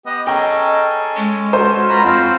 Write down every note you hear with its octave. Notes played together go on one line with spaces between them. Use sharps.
B3 G4 D#5
C#4 G#4 A4 D#5 G5 A#5
G#3 C#4
F#4 A4 C5
F4 A#5 B5
F2 C4 F4 F#4